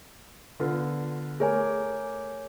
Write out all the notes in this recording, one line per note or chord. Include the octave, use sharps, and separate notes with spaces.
D3 B3 F4
A3 G#4 A#4 C#5 G#5